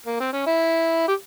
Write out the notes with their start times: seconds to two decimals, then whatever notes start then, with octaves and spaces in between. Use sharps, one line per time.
0.06 A#3
0.20 C4
0.33 C#4
0.46 E4
1.08 G4